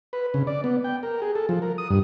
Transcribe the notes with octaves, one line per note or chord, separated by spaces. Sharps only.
B4
C#3
D5
B3
G5
A#4
G#4
A4
F3
A#4
D#6
G2